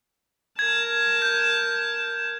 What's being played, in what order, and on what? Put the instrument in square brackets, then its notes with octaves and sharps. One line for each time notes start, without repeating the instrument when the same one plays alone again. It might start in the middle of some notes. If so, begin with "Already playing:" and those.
[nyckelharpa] A#4 A5 [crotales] G#6
[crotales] G6